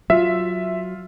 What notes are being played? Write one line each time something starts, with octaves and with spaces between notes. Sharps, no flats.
F#3 F4 E5